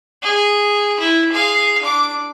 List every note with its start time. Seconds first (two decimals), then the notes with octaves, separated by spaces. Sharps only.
0.23 G#4
0.99 E4
1.32 G#4 F5
1.82 D4 D6